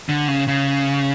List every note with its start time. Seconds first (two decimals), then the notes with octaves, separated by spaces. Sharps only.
0.09 D3
0.28 C#3
0.48 C#3